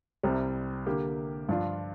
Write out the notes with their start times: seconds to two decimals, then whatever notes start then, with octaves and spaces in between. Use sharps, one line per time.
0.23 C2 C3 G3 C4
0.86 D3 A#3 G4
1.49 G2 F3 D4 F4